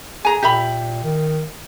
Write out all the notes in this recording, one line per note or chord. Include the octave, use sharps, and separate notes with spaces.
G#4 G#5 A#5
A#2 G4 E5 B5
D#3